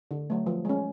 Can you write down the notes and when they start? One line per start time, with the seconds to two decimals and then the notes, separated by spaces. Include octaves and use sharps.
0.11 D3
0.30 F#3 A3
0.47 F3
0.65 G#3 C#4